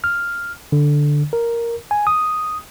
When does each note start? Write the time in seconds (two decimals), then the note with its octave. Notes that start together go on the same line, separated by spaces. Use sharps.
0.04 F6
0.72 D3
1.33 A#4
1.91 G#5
2.07 D#6